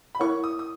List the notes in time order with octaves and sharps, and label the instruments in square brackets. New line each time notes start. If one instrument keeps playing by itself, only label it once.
[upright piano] B5
[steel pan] E4 A#4 C#5 F#5 [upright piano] C#6
[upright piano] D#6
D#6